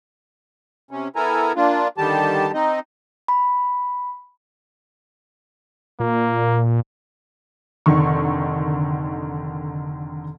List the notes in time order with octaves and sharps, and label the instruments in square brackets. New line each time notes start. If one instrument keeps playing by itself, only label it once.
[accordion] C3 C#4
B3 E4 A4 A#4 G#5 A#5
A#3 D4 F4
D3 D#3 G3 G4 A5
C4 D#4 D#5
[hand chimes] B5
[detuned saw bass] A#2 [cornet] A#3
[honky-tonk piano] F1 D3 D#3 C#6